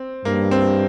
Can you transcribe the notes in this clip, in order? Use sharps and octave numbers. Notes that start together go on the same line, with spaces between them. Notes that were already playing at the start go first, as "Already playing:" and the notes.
Already playing: C4
G2 A#3
C4